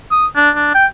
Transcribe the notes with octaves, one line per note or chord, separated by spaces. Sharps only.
D#6
D4
D4
G5